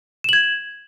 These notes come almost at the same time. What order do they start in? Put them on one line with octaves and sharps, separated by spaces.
E7 F#7 G#6